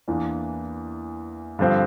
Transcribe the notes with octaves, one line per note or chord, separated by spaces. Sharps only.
E2 E3 A#3 D4
G2 D3 F3 C4